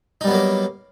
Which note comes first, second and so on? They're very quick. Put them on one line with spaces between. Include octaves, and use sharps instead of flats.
D#4 G3 B3 F#3 A#3